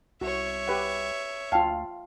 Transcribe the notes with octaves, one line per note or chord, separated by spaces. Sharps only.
C2 F#4 C#5 E5
G4 B4 F#5
D2 F4 F5 G5 A5